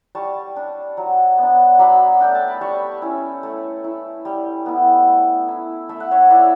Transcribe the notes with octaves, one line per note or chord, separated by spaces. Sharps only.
G3 A5 C#6
D4
F#3
B3 D4
F#3 B5 D6
A3 D4 G5
A5
B5
G3 A5 C#6
C#4 E4
A3
E4
G3
B3 E4
A3
E4
A3 E5
F#5
C#5 E5
E4 D5
E5